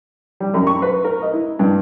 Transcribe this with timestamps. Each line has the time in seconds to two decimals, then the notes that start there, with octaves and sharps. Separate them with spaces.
0.40 G3
0.54 F#2
0.67 C#6
0.82 B4
1.04 A#4
1.22 D#5
1.33 E4
1.59 G2